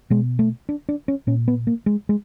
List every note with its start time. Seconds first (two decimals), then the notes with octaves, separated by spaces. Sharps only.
0.10 B2 G#3
0.39 A3
0.69 D4
0.89 D4
1.08 C#4
1.27 A#2 C#4
1.48 B3
1.67 A#3
1.86 G#3
2.09 G#3